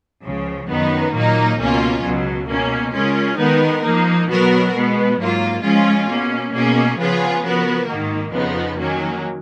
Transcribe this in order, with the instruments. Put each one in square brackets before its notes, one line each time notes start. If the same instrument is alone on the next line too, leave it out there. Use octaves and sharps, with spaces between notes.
[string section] C#2 C#3 F3
F#2 D#3 F#3 B3 D#4
A#2 F#3 A#3 D#4
C#2 B2 A#3 C#4 F4
C#2 B2 F#3
B2 A#3 C#4
C#3 G#3 C#4 F4 A#4
D#3 G#3 B3 D#4 A#4
F3 A#3 D#4
B2 F#3 B3 F#4 A#4
B2 G#3 B3
G#2 F#3 A#3 F4
F3 G#3 C#4 F4 G#4
B2 A#3 C#4
B2 A#3 C#4 G#4
C#3 F3 B3 F4 G#4
F3 B3 F#4 A#4
G#2 D#3 A#3
F2 C#3 F3 B3 D#4
D#3 F#3 A#3 C#4